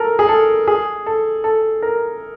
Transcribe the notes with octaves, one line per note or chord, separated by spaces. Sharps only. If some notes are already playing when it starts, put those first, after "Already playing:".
Already playing: A4 A#4
G#4
A4
G#4
A4
A4
A#4